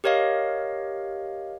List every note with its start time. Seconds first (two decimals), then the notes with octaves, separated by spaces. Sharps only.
0.04 G4 A#4 C#5 D#5 F5